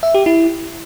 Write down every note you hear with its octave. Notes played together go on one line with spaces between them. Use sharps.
E5
G4
E4